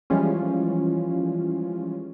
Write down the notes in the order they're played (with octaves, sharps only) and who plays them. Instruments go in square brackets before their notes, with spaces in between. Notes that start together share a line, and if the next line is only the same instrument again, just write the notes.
[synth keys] E3 F3 G3 G#3 C#4 F4